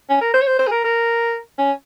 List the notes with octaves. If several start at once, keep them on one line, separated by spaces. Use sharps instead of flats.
C#4
A#4
C5
C#5
C5
C5
G#4
A#4
A#4
C#4